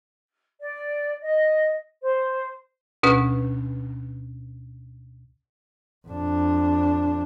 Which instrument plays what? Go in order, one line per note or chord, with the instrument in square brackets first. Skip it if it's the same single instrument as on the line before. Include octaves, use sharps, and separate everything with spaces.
[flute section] D5
D#5
C5
[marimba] D2 B2 C#4 B4
[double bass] F2 D4